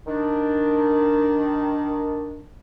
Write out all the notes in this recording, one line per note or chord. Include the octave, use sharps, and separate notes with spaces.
D#3 D4